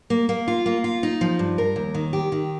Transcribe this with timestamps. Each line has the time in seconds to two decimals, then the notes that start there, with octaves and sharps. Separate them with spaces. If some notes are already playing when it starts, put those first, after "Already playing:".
0.10 A#3
0.29 A#3
0.48 F4
0.66 A#3
0.84 F4
1.03 D#4
1.21 F3
1.39 G2
1.58 A#4
1.76 D#2
1.94 D#3
2.13 G4
2.32 D#3